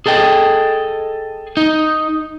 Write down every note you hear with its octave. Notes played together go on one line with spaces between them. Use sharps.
G#4 A4 D#5 G5
D#4